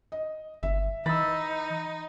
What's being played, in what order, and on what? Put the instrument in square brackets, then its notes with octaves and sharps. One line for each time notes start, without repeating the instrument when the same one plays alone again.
[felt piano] D#5
[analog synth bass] G1 [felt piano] E5
[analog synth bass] E3 [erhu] D#4 [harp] B5 E6 [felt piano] A6